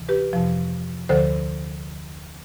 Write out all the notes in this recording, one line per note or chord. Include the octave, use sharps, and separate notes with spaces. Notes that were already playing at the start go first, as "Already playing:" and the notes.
Already playing: D2 C3 E3
G4 B4
F2 C3 F3
D2 D3 F3 A4 C5